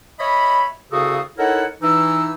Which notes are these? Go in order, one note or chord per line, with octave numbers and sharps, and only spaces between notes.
C#5 D#5 E5 B5
C2 C#3 F#4 A4 F5 D#6
D#4 E4 A4 A#4 C#5 F#5
E3 D#4 E6